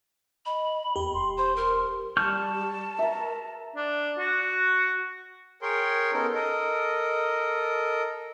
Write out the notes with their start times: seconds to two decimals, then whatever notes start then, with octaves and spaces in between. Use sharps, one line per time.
0.46 D#5 B5
0.96 E2 G4
1.14 D#1 C6
1.38 C5 C6
1.56 A#4
2.17 G3 A5 C#6 F6 G6
2.99 A#4 E5 A#5
3.76 D4
4.19 F#4
5.62 G#4 A#4 C#5 G5 C6
6.13 B3 C#4 D#4 A4 A#4
6.34 A4 A#4 D#5